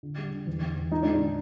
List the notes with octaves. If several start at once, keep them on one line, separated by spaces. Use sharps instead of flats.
D3
G3
D3
E2
E2
E2
G#2 D#4
G#3 D4
D#4
D#3